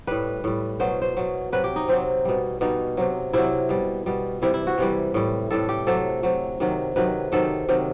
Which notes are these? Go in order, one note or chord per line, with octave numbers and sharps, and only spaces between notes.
A2 G3 B4
A2 G3
B2 F#3 C5
C5
B2 F#3
C3 F#3 B4
G4
D#4
C3 F#3 C4
B2 G3
B2 G3 D#4
C3 F#3
C3 F#3 E4
B2 G3
B2 G3
C3 E3 G3 E4
E4
F#4
C3 E3 G3
A2 G3
A2 G3 A4
G4
C3 F#3 A4
C3 F#3
C3 D#3 F#3
C3 D#3 F#3 B4
C3 D#3 F#3 A4
C3 D#3 F#3